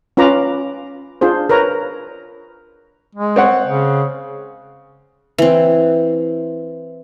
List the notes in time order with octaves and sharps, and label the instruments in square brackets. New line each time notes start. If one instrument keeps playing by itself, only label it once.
[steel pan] C#4 F4 B4 A#5 B5 D6
D4 F4 G#4 C5
A#4 B4 C#5 A#5
[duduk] G#3
[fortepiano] C4 C#5 F#5
[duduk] C#3
[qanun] E3 C4